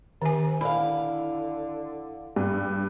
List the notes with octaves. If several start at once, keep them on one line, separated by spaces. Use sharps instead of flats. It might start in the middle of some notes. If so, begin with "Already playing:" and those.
C3 D#3 G#5
D3 E4 F5 B5
G2 G3